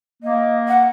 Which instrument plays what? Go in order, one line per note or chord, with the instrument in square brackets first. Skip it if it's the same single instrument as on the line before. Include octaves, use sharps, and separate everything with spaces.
[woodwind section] A#3 [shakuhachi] D#5
[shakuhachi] F#5